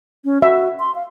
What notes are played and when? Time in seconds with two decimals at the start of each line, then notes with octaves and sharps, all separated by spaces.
0.25 C#4
0.42 F#4 E5
0.80 C6
0.95 F5